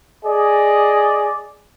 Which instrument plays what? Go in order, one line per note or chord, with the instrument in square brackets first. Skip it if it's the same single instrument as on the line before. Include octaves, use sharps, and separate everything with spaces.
[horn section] G#4 D5 D#5